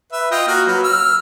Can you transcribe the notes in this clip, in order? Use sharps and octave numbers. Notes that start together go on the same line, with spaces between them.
B4 E5
F4 D#5 G5
A#3 F#4 F6
F#3 B4
E6 F6